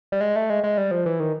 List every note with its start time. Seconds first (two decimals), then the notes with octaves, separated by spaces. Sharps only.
0.12 G3
0.21 G#3
0.36 A3
0.50 G#3
0.64 G#3
0.78 G3
0.91 F3
1.06 E3
1.20 D#3